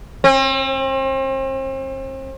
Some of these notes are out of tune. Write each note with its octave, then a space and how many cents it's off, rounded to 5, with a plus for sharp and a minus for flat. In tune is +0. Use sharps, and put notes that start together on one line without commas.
C4 +40